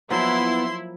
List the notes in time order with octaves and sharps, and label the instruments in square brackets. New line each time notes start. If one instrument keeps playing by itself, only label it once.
[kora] F3 F#3 A#3 [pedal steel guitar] B3 [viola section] E4 [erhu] C6